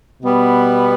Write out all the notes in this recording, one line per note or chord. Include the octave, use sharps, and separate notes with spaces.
B2 G3 B3